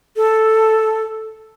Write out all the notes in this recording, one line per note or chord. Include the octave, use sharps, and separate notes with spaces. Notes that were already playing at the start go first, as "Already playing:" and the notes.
A4